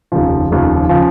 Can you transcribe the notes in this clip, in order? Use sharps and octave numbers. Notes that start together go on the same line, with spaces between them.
F1 D#2 C#3 F3
F1 D#2 C#3 F3
C#3 F3